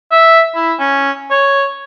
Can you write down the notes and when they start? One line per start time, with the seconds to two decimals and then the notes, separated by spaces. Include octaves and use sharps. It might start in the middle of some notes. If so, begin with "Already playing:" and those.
0.12 E5
0.55 E4
0.80 C#4
1.31 C#5